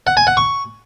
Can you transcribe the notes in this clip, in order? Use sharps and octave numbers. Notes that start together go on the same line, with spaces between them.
F#5
G#5
F#5
C#6